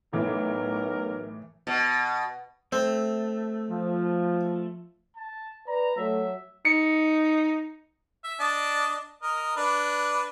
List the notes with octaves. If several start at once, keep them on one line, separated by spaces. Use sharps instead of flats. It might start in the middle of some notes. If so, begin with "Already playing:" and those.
B1 A2 E3 A#4
B2
A3 C4
F3
A5
B4 D5 A#5
F#3 A3 E5
D#4 C#7
E5
D4 D#5 A5
A#4 D#5
D4 B4